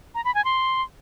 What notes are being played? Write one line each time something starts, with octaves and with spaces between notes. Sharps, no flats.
A#5
B5
G#5
C6